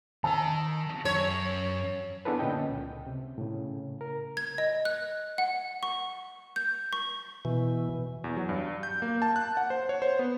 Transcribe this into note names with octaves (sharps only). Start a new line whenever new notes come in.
D#3 A5 A#5 E6
F#2 C#5
B3 D4 E4 G#4 A4 B4
A#2 D3 C#4 D#5 G5
C#2
C3
A2 C#3
A#4
G#6
D#5
F#6
F#5
C#6
G6
C#6
B2 E3
E2
F#3
G2
G6
A#3
A5
F#6
F#5
C5
C#5
C5
B3